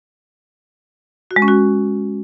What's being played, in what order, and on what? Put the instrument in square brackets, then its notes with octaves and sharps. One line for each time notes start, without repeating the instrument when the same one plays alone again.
[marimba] F#4
G#3
C#4
F#4